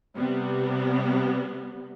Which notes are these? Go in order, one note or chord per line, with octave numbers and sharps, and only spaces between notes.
C3 G3 B3